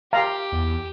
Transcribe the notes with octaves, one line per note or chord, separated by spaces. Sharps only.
G4 F5 A#5
E2